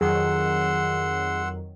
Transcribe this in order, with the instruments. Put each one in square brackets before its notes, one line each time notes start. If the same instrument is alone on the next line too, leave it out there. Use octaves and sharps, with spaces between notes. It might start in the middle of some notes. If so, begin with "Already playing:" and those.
[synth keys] F2 D#3 F#3 [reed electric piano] G#4 [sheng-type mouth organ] F#5 C6 E6